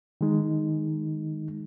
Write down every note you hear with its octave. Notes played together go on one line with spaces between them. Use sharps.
D#3 G#3 D#4